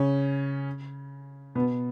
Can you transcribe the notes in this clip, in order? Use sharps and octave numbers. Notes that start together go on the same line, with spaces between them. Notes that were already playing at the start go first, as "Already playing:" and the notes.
Already playing: C#3 C#4
B2 B3